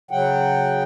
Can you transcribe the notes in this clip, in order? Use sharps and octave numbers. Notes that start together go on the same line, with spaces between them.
C#3 F#3 F#5 G5